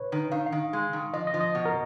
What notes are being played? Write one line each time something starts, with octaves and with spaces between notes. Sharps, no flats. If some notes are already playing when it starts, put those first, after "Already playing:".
Already playing: B4 C#5
D#3
D#3 F5
F5
D#3
G#3
D#3
F3 D#5
D#5
F3
D#5
B2
A#4